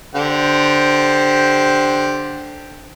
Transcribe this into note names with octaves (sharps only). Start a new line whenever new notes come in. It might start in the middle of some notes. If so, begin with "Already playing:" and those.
D3 G4 C5